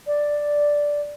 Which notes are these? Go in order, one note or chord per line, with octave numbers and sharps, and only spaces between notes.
D5